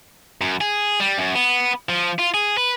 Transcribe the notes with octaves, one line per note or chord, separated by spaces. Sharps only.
F#2
G#4
G3
F#2
B3
F3
F4
G#4
B4